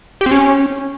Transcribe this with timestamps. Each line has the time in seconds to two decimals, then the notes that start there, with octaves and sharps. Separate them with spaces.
0.21 G4
0.26 C4
0.31 C#4